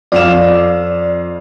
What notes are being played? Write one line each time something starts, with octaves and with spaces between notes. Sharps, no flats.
F2 D5 F5 E7